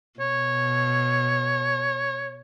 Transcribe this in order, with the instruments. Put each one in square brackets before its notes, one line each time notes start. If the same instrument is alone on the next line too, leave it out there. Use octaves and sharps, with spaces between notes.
[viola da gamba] B2 [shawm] C#5